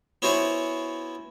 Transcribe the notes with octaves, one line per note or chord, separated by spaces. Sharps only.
B3 C#4 E4 F#4 C5 C#5